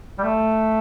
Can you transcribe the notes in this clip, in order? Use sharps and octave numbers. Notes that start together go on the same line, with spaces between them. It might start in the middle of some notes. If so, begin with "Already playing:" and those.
G3
A3